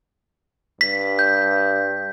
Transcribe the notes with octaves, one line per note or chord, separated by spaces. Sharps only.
G2 B6
G6